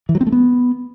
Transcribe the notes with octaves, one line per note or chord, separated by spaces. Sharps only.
E3
F#3
C4
A3
B3